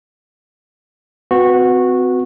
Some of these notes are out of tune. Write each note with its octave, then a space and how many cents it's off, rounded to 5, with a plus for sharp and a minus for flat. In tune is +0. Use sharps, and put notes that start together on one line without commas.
C4 -30 F#4 -15 B4 +0